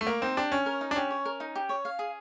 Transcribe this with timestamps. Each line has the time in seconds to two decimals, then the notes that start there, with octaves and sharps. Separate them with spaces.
0.01 A3
0.07 A#3 A#4
0.22 C4 D#4
0.37 D4 G4
0.52 C#4 C#5
0.66 A#4
0.81 D#4
0.91 D4
0.96 C#4 G4
1.10 C#5
1.25 A#4
1.40 D#4
1.56 G4
1.69 C#5
1.85 F5
1.99 G#4